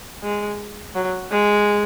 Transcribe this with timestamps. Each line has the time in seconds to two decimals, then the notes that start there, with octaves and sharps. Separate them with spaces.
0.23 G#3
0.96 F#3
1.32 G#3